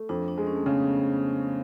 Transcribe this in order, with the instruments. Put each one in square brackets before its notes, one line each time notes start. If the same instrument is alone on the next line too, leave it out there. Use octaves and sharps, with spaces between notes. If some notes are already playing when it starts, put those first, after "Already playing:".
Already playing: [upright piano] A3
[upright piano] F2 [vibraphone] D4
[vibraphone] D4
[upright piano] G#3
[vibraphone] C#4
A3
[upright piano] C#3 [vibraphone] B3